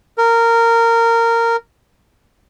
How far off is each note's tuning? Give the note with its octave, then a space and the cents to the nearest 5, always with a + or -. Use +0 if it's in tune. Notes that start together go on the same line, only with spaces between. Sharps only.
A#4 -15